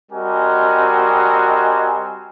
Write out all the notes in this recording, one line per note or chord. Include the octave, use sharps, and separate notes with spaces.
G3 C4 F#4 A#4 D#5 G#5